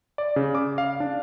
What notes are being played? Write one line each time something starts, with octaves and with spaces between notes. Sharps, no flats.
D5
C#3
D6
F5
D4